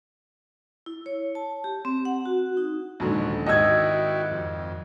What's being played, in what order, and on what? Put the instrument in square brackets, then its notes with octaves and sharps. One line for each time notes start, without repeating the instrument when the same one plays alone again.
[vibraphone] E4
C#5
A5
G4
C4
F#5
F#4
D#4
[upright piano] D#1 G#2 D3 [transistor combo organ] E3 F3 C#4
[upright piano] G#1 E6 [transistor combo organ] E4 F#4 G4 [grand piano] D#5 G#6
[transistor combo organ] F2